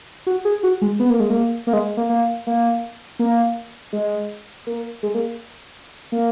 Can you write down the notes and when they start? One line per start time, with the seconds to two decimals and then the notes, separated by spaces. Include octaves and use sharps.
0.27 F#4
0.45 G#4
0.63 F#4
0.82 G#3
0.99 B3
1.10 A#3
1.20 G#3
1.30 A#3
1.67 A#3
1.73 G#3
1.97 A#3
2.09 A#3
2.47 A#3
3.19 A#3
3.93 G#3
4.67 A#3
5.03 G#3
5.14 A#3
6.12 A#3